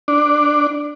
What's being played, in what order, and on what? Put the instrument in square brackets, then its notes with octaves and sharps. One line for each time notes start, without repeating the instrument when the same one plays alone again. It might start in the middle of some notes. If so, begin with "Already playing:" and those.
[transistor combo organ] D4